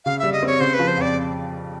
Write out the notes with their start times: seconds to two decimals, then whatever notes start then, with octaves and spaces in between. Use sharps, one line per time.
0.05 C#3 F5
0.19 G3 E5
0.33 D#5
0.43 C4 C#5
0.60 C#3 C5
0.74 B4
0.79 F3
0.88 C5
0.97 F2 D5